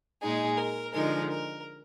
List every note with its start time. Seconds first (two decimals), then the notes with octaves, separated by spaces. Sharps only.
0.21 A#2 G#3 D#4 G#4
0.57 A#4
0.93 D3 F3 G#3 D#4 A#4
1.30 A#4